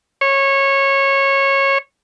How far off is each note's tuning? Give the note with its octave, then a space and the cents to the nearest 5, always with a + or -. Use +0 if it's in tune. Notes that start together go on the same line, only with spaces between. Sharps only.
C#5 -15